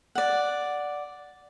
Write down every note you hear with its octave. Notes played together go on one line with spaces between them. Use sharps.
D5 F#5